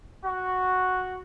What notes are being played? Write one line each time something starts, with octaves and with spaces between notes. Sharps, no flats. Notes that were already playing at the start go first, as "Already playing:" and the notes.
F#4